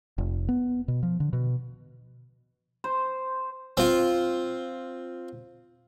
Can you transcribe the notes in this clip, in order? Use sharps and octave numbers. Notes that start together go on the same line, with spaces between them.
F1
B3
B2
F3
D3
B2
C5
C4 F4